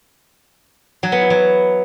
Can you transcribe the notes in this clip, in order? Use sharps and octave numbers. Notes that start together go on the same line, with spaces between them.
F#3
B3
E4
F#3